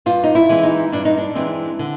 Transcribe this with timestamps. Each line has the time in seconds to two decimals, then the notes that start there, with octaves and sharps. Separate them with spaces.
0.06 G2 F4
0.24 D#4
0.35 E4
0.49 E3 G#3 C4
0.63 D#4
0.92 G2 D4
1.05 D#4
1.18 D4
1.35 E3 G#3 C4
1.79 D3